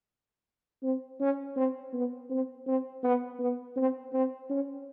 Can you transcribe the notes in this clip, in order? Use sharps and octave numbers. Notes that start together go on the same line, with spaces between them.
C4
C#4
C4
B3
C4
C4
B3
B3
C4
C4
C#4